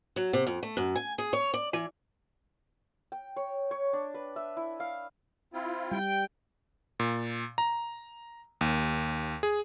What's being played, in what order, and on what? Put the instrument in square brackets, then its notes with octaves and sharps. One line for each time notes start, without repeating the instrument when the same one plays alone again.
[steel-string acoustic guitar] F#3
C3
F2
A3
F#2
G#5
G#4
C#5
D5
E3
[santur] G5
C#5
C#5
D4
B4
E5
E4
F5
[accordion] C4 E4 F4
[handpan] G3 [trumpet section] G5
[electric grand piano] A#2
A#5
D#2
G#4